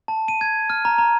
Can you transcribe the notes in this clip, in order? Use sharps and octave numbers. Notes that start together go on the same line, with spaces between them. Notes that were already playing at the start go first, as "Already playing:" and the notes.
A5
D#7
G#6
F6
A#5
A#5